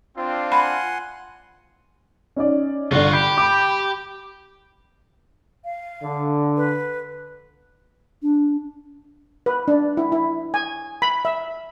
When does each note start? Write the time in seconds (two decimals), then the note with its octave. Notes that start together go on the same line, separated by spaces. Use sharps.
0.17 C4 D4 F4
0.52 F#5 G#5 B5 C6
2.36 C#4 D#4 D5
2.91 G1 D3 F4 F#4
3.13 G4 B5
3.37 B5 D6
5.65 F5
6.02 D3
6.57 B4
8.22 D4
9.46 B4
9.68 D4
9.97 E4
10.12 E4
10.54 G#5
11.02 B5
11.25 E5